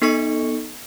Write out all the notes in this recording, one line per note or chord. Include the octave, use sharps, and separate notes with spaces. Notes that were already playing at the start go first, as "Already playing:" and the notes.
B3 D#4 A4 D#5 C#6 C#7